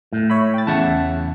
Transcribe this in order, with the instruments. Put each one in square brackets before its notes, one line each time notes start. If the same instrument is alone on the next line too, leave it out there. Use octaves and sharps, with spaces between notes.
[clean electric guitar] A2
[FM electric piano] C#5 E5 B5
G5 A6
[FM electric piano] E2 C#3 [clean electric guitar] E5 F#5 A5